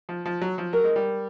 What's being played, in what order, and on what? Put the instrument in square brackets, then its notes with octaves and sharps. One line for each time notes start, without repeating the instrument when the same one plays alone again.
[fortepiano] F3
F3
F#3
F3
[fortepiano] F#3 [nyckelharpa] A#4
[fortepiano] G#3
G3